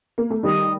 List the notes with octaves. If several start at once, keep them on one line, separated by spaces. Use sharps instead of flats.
A#3
A3
D#3 G3 D#5